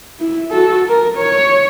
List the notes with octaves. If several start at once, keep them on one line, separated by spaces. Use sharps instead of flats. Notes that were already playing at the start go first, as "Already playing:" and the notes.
E4
F#4 A4
A#4
C#5